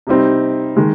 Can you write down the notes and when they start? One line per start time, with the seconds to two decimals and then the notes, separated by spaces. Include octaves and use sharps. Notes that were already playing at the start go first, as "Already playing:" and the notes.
0.07 C3 G3 C4 D#4
0.77 D#3 G#3